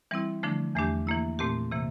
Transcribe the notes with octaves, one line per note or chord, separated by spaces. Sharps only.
E3 G3 C4 E4
D3 F3 A3 D4
E2 E3 A3 D4 G4
E3 A#3 E4
A#2 A3 C4 G4
C3 E3 A#3